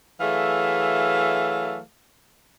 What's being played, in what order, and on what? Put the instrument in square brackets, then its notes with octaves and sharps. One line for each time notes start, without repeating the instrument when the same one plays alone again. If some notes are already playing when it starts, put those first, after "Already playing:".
[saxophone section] E3 F#3 A3 G#4 F5